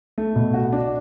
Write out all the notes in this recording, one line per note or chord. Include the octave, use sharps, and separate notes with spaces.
A3
B2
F#4
D4